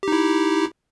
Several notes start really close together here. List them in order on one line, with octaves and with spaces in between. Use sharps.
G4 D#4 E4